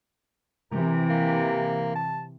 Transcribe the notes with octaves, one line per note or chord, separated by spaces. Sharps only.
C3 E3 A#4
A#3
A5